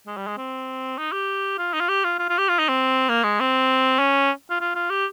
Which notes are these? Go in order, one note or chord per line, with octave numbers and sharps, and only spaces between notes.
G#3
G3
G#3
C4
D#4
G4
F4
D#4
F4
G4
F4
F4
F4
G4
F4
D#4
C4
A#3
G#3
C4
C#4
F4
F4
F4
G4